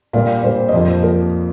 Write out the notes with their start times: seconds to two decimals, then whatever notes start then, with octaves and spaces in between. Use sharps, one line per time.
0.13 A#2 G3 A#3 F5
0.43 A#2 G3 A#3 C5
0.68 D#5
0.72 F2 F3 A#3 C5
1.03 F3 A#3 A#4